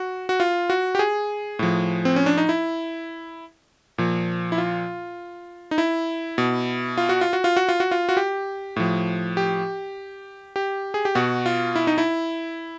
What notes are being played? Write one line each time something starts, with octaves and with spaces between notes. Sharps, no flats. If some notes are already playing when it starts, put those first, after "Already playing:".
Already playing: F#4
F#4
F4
F#4
G4
G#4
A2 F3
C4
C#4
D4
D#4
E4
A#2 F3
E4
F4
D#4
E4
B2
F4
F#4
F4
F#4
F4
F#4
F4
F#4
F4
F#4
G4
A2 F3
G4
G4
G#4
G4
B2 F#4
F4
E4
D#4
E4